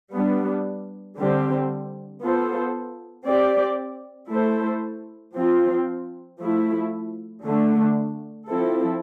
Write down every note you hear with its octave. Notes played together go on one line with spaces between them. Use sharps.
G3 B3 D4
D3 G3 C4 G4
B3 F4 A4 C5
C4 G4 D5
A3 E4 A4 C5
F3 C4 F4
F3 A3 E4
D3 A3 D4
F3 C4 E4 A4